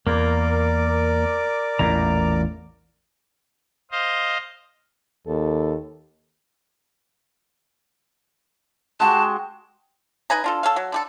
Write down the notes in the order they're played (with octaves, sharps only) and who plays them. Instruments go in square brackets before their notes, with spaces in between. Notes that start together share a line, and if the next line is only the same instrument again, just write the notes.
[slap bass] E2 [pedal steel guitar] A#3 [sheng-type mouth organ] A#4 D5 D6
[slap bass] A1 E2 A#2 [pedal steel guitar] A#5
[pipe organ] C5 D#5 F5
[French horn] D#2 [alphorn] A4
[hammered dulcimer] G#3 F#4 G4 [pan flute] A5
[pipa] D#4 B4 G#5 A#5
D4 F4 A4
A4 C#5 F5
F#3
D3 G4 A4